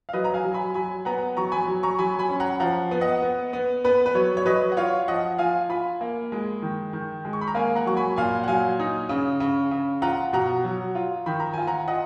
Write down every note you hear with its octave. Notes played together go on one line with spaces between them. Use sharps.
F5
F#3 B4 D#5
A#5
F5 G#5
F#3
G#5 B5
F#3 G#5 B5
B3 F#5 A#5
F#3 A#5 C#6
G#5 B5
F#3
A#5 C#6
F#3 G#5 B5
G#5 B5
C#4
F#5 A#5
F3 F#5 A#5
B3
D#5 F#5
B3
B3
B3 B4
B4
F#3 C#5
C#5
F#3 B4 D#5
F#5
F4 C#5 F5
F3 D#5 F#5
F4 F5 G#5
F4 G#5 B5
A#3
G#3
D#3
D#3
G#3
C#6
B5
A#5
A#3 F5 G#5
F#5 A#5
F#3 C#6
G#5 B5
A#2 F5 G#5
F#5
F#3 F5 G#5
D#4
C#3
C#3
C#3
F4 F#5 A#5
B2 F#5 A#5
F#3
F4
D#3 B5
A#5
F4 G#5
F#5 A#5
F4 D#5 F#5